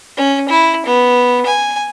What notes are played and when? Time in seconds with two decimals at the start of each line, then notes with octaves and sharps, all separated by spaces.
0.17 C#4
0.49 E4
0.86 B3
1.46 G#5